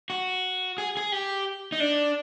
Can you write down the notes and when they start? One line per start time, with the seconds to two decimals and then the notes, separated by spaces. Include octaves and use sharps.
0.10 F#4
0.78 G#4
0.97 G#4
1.12 G4
1.72 D#4
1.80 D4